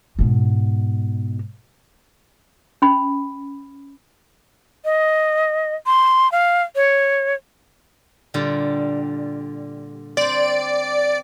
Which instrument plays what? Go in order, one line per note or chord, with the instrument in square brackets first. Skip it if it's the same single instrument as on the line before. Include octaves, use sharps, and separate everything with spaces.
[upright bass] G#2 B2
[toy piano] C#4 B5
[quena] D#5
C6
F5
C#5
[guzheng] A#2 D3 G3
[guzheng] C4 C5 [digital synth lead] D5